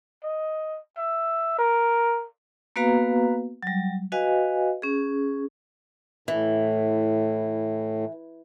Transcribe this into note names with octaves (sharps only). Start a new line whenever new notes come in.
D#5
E5
A#4
A#3 B3 F#4 B4 F5 A#5
F#3 G3
F#4 B4 D#5 F5 G#5
C#4 G#4
A2 E3